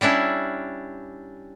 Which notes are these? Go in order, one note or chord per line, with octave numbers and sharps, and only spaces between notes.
G3 C#4 D4 E4